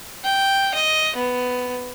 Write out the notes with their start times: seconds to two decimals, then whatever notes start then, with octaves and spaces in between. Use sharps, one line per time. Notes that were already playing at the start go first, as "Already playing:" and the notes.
0.24 G5
0.74 D#5
1.16 B3